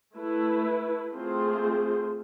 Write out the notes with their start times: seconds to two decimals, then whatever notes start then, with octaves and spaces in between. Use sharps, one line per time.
0.15 A3 E4 B4
1.14 A3 C4 F4 G#4 C5